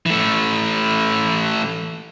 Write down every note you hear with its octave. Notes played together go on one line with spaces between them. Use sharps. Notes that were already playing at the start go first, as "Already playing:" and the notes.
E3 A3